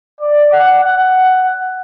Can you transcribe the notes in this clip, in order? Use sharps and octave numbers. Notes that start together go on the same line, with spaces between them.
D5
F#5
F#5